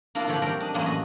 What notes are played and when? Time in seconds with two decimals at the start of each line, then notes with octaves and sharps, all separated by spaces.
0.15 A#3 D4 E4 F4 A#4
0.27 G2 D3 F3 C#5 B5
0.42 F#3 G3 C4 A#4 D5
0.60 D4 D#5
0.74 F#2 A2 E3 F#3 A#3 C6
0.86 F#4 A4 D#5